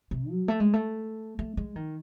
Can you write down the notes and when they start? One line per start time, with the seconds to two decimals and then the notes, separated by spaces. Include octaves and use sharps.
0.11 C3
0.30 F#3
0.48 A3
0.60 G#3
0.73 A3
1.39 A3
1.57 G#3
1.76 D#3